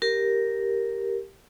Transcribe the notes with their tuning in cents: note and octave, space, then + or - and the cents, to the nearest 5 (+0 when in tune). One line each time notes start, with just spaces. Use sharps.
G4 +0 A#4 +0